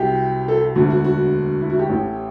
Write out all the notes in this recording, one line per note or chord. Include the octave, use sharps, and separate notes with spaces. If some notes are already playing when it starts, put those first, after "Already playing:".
Already playing: C2 C3 F#3 G4
A4
E1 D2 D3 F#4
F#4
F#4
E4
F#4
G4
A1 A2 E3